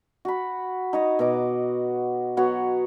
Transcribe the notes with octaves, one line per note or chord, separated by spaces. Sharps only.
F#4 B5
D#4 C#5 D#5
B2 B3 D#5 D6
F#3 B3 F#4 C#5